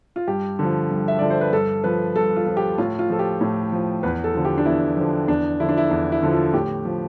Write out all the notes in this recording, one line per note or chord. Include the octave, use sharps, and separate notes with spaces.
F4
G2 G4
D3 F3
G2
E5
D3 F3 D5
C5
B4
G2 A4
F3 B4
G2 A4
F4
F3
G4
A2 F4
F4
F3 A4
G4
A2
F3
E2 B4
A4
D3 F3
G4
D4
E2 E4
D3 F3
E2 D4
D3 F3 E4
D4
E4
E2 D4
E4
D3 F3
F4
A2 G4
F3